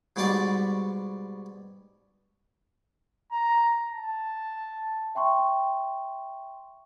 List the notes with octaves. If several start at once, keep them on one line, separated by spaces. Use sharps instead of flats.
G#2 B2 G3 G4 D5 C#6
A#5
A5
E5 G5 C6 C#6